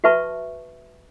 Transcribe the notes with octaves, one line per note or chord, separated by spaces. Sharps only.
F#4 B4 E5 A5 C#6